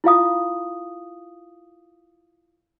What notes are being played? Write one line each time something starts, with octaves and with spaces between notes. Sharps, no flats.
E4 F4 F5 D#6